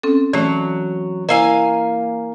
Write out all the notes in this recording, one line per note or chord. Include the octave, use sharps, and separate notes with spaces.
C4 C#4 A4
E3 F#3 A3 C#4
A#3 E4 D#5 F5 G#5